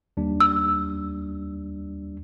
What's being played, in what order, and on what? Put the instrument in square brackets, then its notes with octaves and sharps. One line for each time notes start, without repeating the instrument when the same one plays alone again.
[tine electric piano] D#2 G3 D4
[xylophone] E6